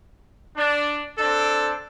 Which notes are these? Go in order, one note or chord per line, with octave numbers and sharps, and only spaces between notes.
D4
C4 D4 A4